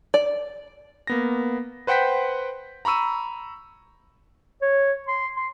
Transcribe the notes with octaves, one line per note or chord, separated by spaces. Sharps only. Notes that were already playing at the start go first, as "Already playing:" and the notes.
D5
A#3 B3 A#6
B4 C5 F#5 G5 G6 B6
A#5 B5 C#6 E6 D#7
C#5
C6
C6